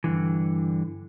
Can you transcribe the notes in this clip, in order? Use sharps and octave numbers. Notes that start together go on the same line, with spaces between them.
G2 D3 E3